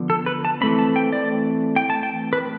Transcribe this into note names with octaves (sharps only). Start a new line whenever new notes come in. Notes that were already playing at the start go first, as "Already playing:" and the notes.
Already playing: D3 F3 B3
A4
B4
A5
E3 A3 C4 B5
A5
G5
D5
G5
A5
G5
B4